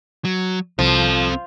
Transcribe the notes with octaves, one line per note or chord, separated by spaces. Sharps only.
F#3
C2 F3 C4 A4